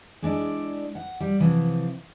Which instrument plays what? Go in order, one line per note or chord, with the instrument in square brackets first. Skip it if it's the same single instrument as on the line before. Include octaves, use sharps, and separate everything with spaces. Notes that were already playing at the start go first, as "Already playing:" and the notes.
[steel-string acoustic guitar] G#3 D4 E4 D5
F#5
G3
C3 E3 F3